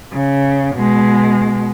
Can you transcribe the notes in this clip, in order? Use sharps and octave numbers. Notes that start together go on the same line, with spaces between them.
C#3
B2 G#3